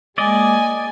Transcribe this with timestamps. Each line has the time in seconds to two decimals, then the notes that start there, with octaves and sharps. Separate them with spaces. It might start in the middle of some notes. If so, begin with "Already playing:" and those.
0.18 G#3 A#3 D5 D#5 G#5